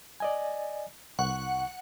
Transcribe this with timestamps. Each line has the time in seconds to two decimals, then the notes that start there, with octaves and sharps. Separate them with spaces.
0.20 D5 D#5 G#5
1.19 C2 F#5 C#6